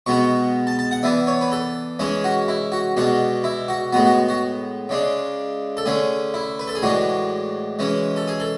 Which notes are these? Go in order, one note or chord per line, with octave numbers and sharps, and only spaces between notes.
B2 G#3 B3 C#6
A5
A5
F#5
E3 B3 D4 E5
C#5
B4
A4
E3 G#3 C#4 G#4
F#4
E4
F#4
B2 G#3 D4 F#4
E4
F#4
A2 G#3 B3 F#4
F#4
F#4
C#3 G#3 D4
A4
D3 A3 C#4 G#4
E4
B4
A4
G#4
A2 E3 G#3 D4 F#4
E3 G#3 C#4
A4
G#4
A4